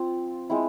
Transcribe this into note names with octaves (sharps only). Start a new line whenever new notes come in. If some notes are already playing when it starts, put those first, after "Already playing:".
Already playing: F3 C4 F4
G#3 C4 E4